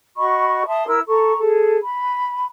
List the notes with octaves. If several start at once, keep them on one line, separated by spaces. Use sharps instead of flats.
F#4 D#5 B5 C#6
E5 A5 C6 D#6
E4 A#4 E6
A4 A#5 C#6
G#4 A4
B5